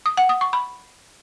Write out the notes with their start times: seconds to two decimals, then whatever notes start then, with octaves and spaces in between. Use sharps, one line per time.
0.06 D#6
0.17 F#5
0.29 D#6
0.41 C#6
0.53 B5